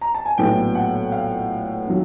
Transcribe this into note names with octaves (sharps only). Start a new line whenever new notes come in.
A#5
A5
G#5
A#1 A2 F#3 B3 G5
F#5
F5
D#3 F#3